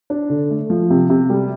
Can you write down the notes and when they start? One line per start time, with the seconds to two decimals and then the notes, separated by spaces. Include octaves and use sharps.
0.10 D4
0.30 D3
0.50 A3
0.70 F3
0.90 C3
1.10 C3
1.30 G3